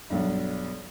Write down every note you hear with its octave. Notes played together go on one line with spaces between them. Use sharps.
B1 G2